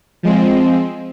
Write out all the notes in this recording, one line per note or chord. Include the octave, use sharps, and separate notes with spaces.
F3 G#3 C4